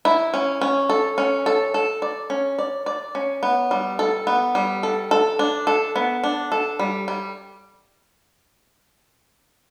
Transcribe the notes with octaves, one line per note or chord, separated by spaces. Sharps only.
E4
C#4
C#4
A4
C#4
A4
A4
D5
C#4
D5
D5
C#4
B3
G3
A4
B3
G3
A4
A4
D4
A4
B3
D4
A4
G3
G3